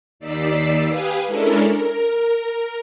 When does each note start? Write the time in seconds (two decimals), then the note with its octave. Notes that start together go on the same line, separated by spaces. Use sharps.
0.19 D#2 D#4 D5 E6 B6 C7
0.88 G4 B4 F5 G#5 D#6
1.27 G#3 C#4 D4 E4 A4 A#4
1.71 A#4